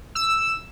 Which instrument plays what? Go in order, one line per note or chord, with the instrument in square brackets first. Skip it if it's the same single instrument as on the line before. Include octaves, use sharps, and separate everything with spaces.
[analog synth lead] E6